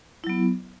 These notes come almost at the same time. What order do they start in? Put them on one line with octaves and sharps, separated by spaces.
E4 F#3 B3